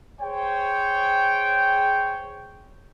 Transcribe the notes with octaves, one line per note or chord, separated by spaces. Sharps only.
G#4 C5 C#5 G5